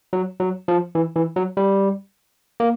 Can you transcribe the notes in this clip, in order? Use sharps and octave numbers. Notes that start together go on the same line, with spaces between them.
F#3
F#3
F3
E3
E3
F#3
G3
A#3